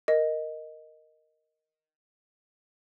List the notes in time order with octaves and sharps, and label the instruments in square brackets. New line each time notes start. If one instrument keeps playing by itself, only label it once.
[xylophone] A#4 D#5